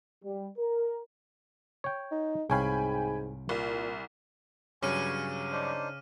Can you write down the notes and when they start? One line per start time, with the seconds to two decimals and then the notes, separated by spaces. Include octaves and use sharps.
0.24 G3
0.58 A#4
1.84 C#5 G5
2.11 D#4
2.50 C2 G#2 C#5 F5 G5 G#5 B5
3.49 C2 A#2
4.82 G2 C#3 F#3 G#5 C#6 D6 F6 D#7
5.52 D4 D#4 C5